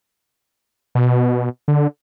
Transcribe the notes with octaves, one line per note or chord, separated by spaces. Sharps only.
B2
D3